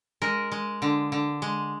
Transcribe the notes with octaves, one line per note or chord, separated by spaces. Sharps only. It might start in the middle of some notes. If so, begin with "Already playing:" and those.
G#3 A#4
G#3
D3
D3
G#3